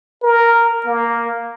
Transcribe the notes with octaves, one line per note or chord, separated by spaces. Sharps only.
A#4
A#3